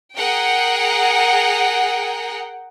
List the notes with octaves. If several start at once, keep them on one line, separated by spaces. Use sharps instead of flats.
G#4 A#4 F#5 G5